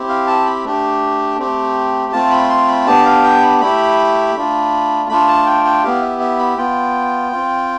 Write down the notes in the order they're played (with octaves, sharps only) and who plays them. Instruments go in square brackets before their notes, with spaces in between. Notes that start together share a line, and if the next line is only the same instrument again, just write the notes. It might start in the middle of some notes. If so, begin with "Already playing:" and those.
Already playing: [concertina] C4 E4 G4
F5
A5
B5
A3 D4 G4
A3 C4 G4
A3 C4 F4 A5
B5
C6
B5
B3 D4 G4 A5
F5
G5
B5
A3 E4 G4 B5
A3 D4 F4
A3 D4 F4 B5
A5
G5
G5
B3 E4 G4 F5
E5
E5
B5
B3 F4 G5
C4 F4